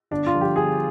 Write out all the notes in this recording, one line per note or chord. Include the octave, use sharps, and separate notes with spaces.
G1 D4
F4
G2 D3 F3
G4
G1 G#4